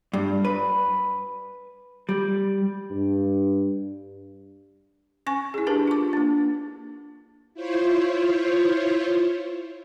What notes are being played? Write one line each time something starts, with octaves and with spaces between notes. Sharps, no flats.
G2
B4
G3
G2
C#4 G#5 C#6
E4 G#4
D4 G4 A#4 B4 A5
F4 D6
A#3 D4
E4 F4 C5 C#5